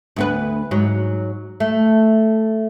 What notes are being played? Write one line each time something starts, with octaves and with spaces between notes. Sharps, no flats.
D2 B3 B4
G#2 F#3
A3